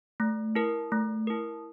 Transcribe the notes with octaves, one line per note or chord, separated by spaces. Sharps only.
A3
E4 A#4
A3
E4 A#4